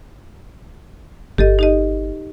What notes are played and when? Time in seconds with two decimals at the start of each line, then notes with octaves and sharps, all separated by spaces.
1.38 G1 G4 A4 D#5
1.59 D#4 G4 D#5